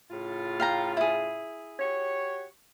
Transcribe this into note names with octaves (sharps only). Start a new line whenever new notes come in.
A2 C#3 F4
F5 G5 A#5
E4 G#4
F#4 G4 C#5